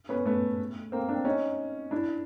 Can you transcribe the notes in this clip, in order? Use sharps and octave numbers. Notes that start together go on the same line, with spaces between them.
B3 C#4
A3 B3
A#3 C4
C4 D4
C#4 D#4
D4 E4